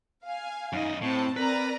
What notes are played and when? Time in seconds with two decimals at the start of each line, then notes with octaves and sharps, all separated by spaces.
0.24 F5 G#5
0.73 F#2 D#4 D#5
1.01 A2 C4 C5 A5
1.36 C4 A#4 B4 D5 A#5